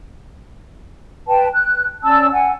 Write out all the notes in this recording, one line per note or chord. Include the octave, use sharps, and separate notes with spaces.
B4 G5 A5
F#6
C#4 D5 A5 E6
F#5 G#5